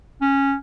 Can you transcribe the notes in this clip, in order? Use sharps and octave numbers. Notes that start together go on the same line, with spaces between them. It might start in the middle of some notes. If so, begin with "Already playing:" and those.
C#4